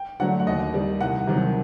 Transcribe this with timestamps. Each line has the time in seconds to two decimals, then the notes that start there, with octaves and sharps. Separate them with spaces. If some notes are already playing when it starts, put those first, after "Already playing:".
Already playing: G5
0.20 D3 F#3 A3 F#5
0.40 F#5
0.46 D#2 D#5
0.74 D#3 G3
1.01 C2 F#5
1.27 C3 D#3 F#3